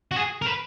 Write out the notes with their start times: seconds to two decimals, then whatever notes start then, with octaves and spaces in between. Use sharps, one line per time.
0.11 F#4
0.16 G#4
0.42 A#4
0.46 B4